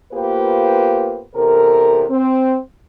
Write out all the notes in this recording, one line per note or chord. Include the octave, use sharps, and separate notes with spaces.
A#3 B3 F4 G4 B4 C5
E2 C3 A4 A#4
C4